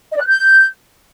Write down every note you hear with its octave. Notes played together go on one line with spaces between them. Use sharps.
D#5
D5
F#6
G6